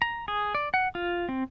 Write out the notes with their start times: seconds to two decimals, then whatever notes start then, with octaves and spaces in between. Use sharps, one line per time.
0.02 A#5
0.28 G#4
0.55 D5
0.74 F#5
0.95 F4
1.29 C4